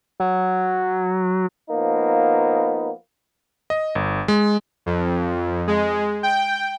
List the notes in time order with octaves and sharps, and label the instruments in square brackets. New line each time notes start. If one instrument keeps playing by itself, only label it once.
[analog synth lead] F#3
[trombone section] F3 A#3 B3 D#4
[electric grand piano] D#5
G1
G#3
[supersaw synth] F2
G#3
G5